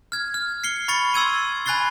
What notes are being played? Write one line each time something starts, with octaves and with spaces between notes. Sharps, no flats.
F6 G#6
F6
C7 C#7 G7
B5 C#6 A6 C#7 G7
C6 E6 G#6 D#7
G#5 B5 F#6 A6 C7 G7